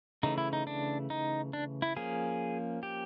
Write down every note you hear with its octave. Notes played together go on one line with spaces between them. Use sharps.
C#3 E3 A3 D#4
E4
D#4
D4
D#4
D4
E4
F3 A#3 C#4 G#4
G4